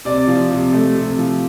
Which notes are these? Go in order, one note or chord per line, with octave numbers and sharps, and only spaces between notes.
C3 D5
F3
C3
A3
C3
F3